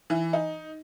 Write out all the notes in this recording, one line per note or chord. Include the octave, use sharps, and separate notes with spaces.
E3
D#4